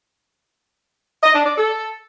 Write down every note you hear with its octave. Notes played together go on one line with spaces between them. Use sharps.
D#5
D4
D5
A4